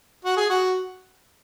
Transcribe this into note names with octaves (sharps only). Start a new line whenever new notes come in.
F#4
G#4
F#4